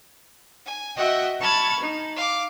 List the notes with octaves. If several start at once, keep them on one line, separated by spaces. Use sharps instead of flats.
G#5
F#4 D#5 E5 F#5 G5
A5 B5 C#6 F6 G#6 A6
D#4
F5 D6